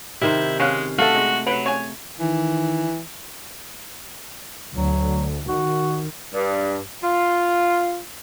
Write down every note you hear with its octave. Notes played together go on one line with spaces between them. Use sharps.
C3 D#3 E4 C5
G#3 C#4 F5 F#6
A3 F#4 A4 F5
G#3
F#3 B4
C#5 G#5
D#3 E3
D2 F#3
D#3 F#4
G2
F4